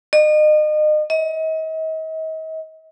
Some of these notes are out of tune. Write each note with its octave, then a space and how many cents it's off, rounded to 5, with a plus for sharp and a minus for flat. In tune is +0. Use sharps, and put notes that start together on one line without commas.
D#5 -35
D#5 +40